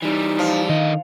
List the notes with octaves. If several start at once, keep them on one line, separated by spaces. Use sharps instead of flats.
E3 G3 D#4
F3
D3 D#3 D#5